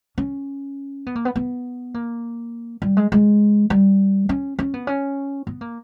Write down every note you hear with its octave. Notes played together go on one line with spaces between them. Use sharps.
C#4
B3
A#3
B3
B3
A#3
G3
G#3
G#3
G3
C#4
C#4
B3
C#4
B3
A#3